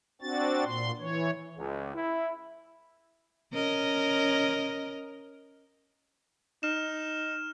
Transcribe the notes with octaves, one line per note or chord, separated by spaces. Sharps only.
C4 D4 F#4 A6
A#2 C6
E3 C#5
C#2
E4
C#4 A#4 D#5
D#4 F6 E7